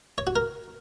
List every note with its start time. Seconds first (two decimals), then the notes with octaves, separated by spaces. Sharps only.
0.18 C#5
0.27 F#4
0.36 A#4